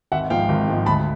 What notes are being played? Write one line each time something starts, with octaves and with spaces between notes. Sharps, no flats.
G#1 E5 F#5
G#2 F3 F5 G5
G#1
G#2 F3
D2 A5 B5